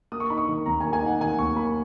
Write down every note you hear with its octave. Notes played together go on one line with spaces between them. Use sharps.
A#3 D#6
C#6
D#4 B5
C#6
D#3
D#2 A#5
G#5
A#3
G#5
D#4 F#5
D#3 G#5
D#2 C#6
A#3 B5